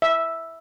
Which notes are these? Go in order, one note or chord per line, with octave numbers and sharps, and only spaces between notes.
E5